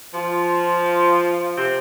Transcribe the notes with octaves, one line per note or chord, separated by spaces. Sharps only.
F3 F4
C3 C4